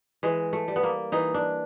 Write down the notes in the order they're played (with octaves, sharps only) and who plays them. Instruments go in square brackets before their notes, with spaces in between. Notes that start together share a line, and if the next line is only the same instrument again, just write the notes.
[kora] E3 G#3
A3
G3
B3
A#3
E3 D#4
D4